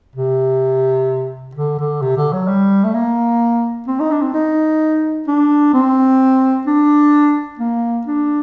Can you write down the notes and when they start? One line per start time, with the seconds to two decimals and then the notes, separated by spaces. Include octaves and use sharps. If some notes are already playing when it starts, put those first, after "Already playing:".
0.16 C3
1.55 D3
1.79 D3
2.02 C3
2.17 D3
2.33 F#3
2.48 G3
2.84 A3
2.94 A#3
3.87 C4
4.00 D#4
4.11 D4
4.22 C4
4.34 D#4
5.27 D4
5.73 C4
6.67 D4
7.59 A#3
8.07 D4